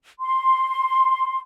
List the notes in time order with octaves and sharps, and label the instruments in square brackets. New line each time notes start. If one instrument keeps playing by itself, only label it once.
[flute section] C6